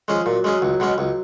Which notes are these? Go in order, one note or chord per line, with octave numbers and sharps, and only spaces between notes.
F3 G#3 C#4 G#4
A#2 F#3
G#3 C#4 G#4
C#2
B2 G#3 C#4
C#2 F#3